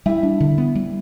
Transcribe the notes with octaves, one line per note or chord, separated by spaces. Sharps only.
G3 E4
D4
D3
B3
G3